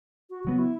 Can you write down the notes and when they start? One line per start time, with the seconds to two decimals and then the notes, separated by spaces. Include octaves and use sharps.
0.30 F#4
0.44 C#3 F#3 B3 F#4
0.59 E4